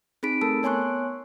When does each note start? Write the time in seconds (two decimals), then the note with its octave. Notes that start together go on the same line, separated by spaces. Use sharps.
0.23 C4 D#4 G#4 B5 B6 D7
0.41 A3 A4 A#4 A5 E6
0.63 B3 C#5 G#5 C6 C#6 F#6